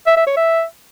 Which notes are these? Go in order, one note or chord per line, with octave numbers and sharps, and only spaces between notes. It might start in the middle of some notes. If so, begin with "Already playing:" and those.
E5
E5
C#5
E5